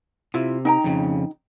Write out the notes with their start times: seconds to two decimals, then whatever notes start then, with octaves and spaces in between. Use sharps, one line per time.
0.34 C3 E4 F4
0.65 D#4 G5 A#5
0.84 F2 C#3